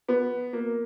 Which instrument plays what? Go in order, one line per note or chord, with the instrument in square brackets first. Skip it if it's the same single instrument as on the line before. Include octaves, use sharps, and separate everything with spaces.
[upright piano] B3
A#3